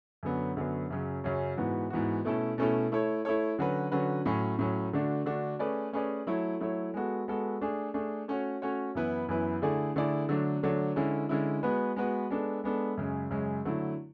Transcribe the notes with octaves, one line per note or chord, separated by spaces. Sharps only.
F#2 D3 F#3 B3
F#2 D3 F#3 B3
F#2 C#3 F#3 C#4
F#2 C#3 F#3 C#4
G#2 E3 B3 F#4
G#2 E3 B3 F#4
B2 A3 C#4 E4 A4
B2 A3 C#4 E4 A4
A3 E4 A4 C#5
A3 E4 A4 C#5
D3 F#3 C#4 F#4 B4
D3 F#3 C#4 F#4 B4
A2 F#3 C#4
A2 F#3 C#4
D3 A3 D4 F#4
D3 A3 D4 F#4
A3 C#4 G#4 B4 D5
A3 C#4 G#4 B4 D5
F#3 A3 E4 A4 C#5
F#3 A3 E4 A4 C#5
G#3 B3 F#4 A4
G#3 B3 F#4 A4
A3 D4 G#4
A3 D4 G#4
A3 C#4 F#4 C#5
A3 C#4 F#4 C#5
F#2 E3 B3 E4 B4
F#2 E3 B3 E4 B4
D3 A3 E4 G#4 D5
D3 A3 E4 G#4 D5
D3 F#3 A3 D4
D3 F#3 A3 D4
D3 G#3 C#4 E4
D3 G#3 C#4 E4
G#3 B3 F#4 B4
G#3 B3 F#4 B4
G#3 B3 D4 A4
G#3 B3 D4 A4
F#2 C#3 G#3
F#2 C#3 G#3
D3 F#3 A3 E4